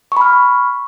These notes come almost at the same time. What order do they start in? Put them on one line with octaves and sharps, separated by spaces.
C#6 B5 F6